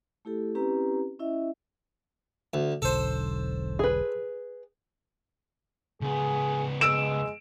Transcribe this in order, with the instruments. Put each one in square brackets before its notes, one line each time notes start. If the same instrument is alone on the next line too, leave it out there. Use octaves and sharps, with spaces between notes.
[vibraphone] A3 E4 G4 A4
C4 C#4 E4 G4 B4 A#5
C#4 E4 D#5 E5
[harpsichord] D2
[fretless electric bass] E1 B1 D3 [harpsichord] A4 C5
[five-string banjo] G#4 B4
[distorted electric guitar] C#2 B3 [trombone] G#4
[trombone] G#3 [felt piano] E6 D7 E7